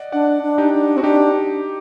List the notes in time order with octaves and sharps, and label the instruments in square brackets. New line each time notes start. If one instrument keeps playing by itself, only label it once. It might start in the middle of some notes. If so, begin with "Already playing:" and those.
Already playing: [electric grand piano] D5 D#5 F#5
[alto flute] D4 [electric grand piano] D5 F#5
[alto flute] D4
[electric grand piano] D#4 G4
[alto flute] D4
[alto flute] C4 [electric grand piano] F#4
[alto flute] D4 [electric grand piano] D#4 G4